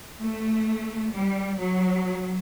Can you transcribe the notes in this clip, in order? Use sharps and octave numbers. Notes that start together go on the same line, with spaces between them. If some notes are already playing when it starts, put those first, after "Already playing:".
A3
G3
F#3